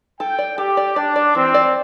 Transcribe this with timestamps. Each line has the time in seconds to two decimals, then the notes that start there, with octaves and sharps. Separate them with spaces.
0.20 A4 G5
0.39 D5
0.58 G4 A4
0.77 D5
0.96 D4 D5
1.16 D5
1.35 E3 C4
1.54 D5